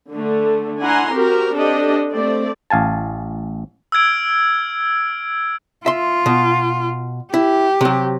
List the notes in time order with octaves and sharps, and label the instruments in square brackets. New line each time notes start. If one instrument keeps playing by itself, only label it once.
[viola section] D3 A3
D4 E4 F#5 G#5 A#5 C6
C4 F#4 G4 A#4
C4 D4 G4 A4 D#5
A3 C4 D5
[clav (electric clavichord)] A1 F5 G#5 A5
[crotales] E6 F6 G#6 D7
[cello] F4 [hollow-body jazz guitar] E5 C6
[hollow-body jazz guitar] B2
[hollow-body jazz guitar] E4 [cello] G4
[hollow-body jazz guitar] C3 F#3